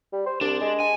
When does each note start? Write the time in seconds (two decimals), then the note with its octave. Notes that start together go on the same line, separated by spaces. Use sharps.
0.13 G3
0.27 C5
0.41 C2 D4
0.61 G#3
0.80 G#5